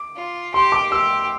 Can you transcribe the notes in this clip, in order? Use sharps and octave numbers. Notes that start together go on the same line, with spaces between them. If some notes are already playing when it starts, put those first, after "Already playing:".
Already playing: D6
F4
G4 C6
D6
G4 E6